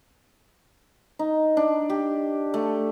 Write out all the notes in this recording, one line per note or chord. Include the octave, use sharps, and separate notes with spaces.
D#4
D4
G4
A3